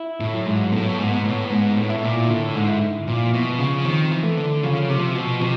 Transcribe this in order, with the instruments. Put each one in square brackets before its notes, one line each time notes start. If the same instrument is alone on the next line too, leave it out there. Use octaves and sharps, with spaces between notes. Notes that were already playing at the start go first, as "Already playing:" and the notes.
Already playing: [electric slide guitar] E4
[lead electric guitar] A2
[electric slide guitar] F#3
[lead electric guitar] G#2
[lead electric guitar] A2 [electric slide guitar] B3
[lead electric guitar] G#2
[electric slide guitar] B3
[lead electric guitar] A2
[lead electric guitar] G#2 [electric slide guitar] B3
[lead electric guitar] A2
[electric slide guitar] E4
[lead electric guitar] A#2
[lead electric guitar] A2 [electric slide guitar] D3
[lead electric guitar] G#2
[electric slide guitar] E4
[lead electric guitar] A#2 [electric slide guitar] F3
[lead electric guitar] B2
[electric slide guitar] F3
[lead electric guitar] C#3
[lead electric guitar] D#3 [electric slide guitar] C4
[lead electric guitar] E3
[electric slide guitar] A3
[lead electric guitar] D3
[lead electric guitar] C#3 [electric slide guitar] F3
[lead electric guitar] C3
[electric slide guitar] F3
[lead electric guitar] B2
[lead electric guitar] C3 [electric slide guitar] F3